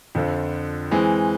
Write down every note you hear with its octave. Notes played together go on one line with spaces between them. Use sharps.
F2 D3 F3
E3 G#3 C4